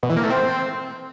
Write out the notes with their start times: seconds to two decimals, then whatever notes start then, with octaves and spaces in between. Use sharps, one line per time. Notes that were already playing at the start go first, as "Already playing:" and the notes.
0.03 B2
0.10 E3
0.17 A#3
0.23 A3
0.30 C4